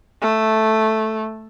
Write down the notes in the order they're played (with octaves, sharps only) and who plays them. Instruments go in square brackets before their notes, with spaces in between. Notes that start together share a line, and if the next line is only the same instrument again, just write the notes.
[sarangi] A3